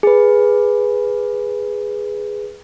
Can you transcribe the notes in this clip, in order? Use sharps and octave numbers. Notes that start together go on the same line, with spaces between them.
G#4 B4